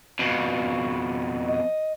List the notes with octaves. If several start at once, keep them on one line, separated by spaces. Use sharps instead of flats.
F2 B2
D#5